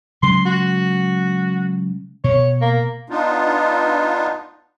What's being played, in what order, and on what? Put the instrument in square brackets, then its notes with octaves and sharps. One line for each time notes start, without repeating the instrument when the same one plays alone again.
[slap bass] C#3 F#3 G#3 [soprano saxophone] C6
[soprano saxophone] F#4
[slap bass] B2 [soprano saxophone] C#5
[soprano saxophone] A#3
[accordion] B3 D4 D#4 F4